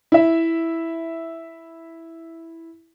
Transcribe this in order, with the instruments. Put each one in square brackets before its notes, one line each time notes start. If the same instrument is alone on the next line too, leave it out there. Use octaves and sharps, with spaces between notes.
[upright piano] E4 E5